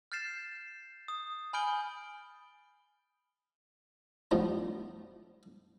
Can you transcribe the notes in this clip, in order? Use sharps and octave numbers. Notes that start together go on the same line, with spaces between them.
F6 G6 A6 C7 E7
D#6
G#5 B5 F6 G6 D7 G7
A2 D3 F3 G3 B3